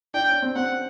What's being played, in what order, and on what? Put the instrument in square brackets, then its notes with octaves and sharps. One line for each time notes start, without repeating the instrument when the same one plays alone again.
[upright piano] D4 [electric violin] G5
[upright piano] C#4
C4
[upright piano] C4 [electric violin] F#5